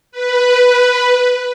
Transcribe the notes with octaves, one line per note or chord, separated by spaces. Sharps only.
B4